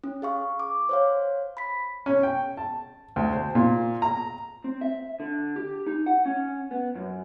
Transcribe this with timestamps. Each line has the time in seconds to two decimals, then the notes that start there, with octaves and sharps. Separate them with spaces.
0.04 C#4
0.22 G#4 F5 C#6
0.60 D6
0.89 C5 C#5 F5
1.57 B5 B6
2.06 C#4
2.23 G5
2.57 A5
3.16 D2
3.32 C5
3.55 A#2
4.02 A#5
4.64 C4
4.81 E5
5.20 D3
5.56 G4
5.86 D#4
6.06 F#5
6.26 C#4
6.71 B3
6.95 F#2